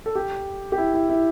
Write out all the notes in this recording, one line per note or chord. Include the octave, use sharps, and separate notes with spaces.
A4
G4
G4
E4
E4
E4